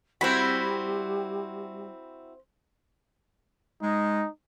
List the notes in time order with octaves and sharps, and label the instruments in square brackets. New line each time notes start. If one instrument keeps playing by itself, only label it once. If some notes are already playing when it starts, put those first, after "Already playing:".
[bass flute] G3 [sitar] C4 E4 F#4 [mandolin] C5 B5
[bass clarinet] G#3 [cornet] D#4